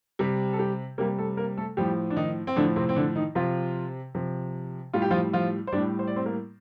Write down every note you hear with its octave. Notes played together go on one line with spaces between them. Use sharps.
C3 G3
A4
G3 G4
C3 G3 A#3 A#4
A3 A4
A#3 A#4
A3 A4
A2 F3 G3 G4
D4
D#3 D#4
C4
A2 D3 F3 D4
C3 C4
C4
D3 D4
D#3 D#4
C3 F3 F4
C3 F3
A2 G3 F4
G4
F3 F4
F3 F4
C5
A2 G3 D4 D5
C5
D5
C4 C5
A#3 A#4